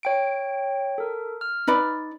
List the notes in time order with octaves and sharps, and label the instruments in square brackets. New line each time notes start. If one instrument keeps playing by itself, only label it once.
[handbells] C#5 G5 D7
A4 A#4
F6
[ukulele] D#4 B4 D5